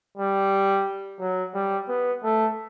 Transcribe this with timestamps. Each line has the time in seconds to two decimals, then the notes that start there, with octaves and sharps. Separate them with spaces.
0.18 G3
1.20 F#3
1.54 G3
1.88 B3
2.24 A3